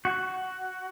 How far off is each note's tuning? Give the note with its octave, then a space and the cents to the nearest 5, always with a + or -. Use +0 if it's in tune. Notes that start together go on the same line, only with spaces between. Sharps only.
F#4 +10